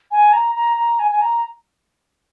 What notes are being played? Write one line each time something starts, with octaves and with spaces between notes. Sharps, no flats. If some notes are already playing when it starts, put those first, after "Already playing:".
G#5
A#5
A#5
A#5
G#5
G#5
A#5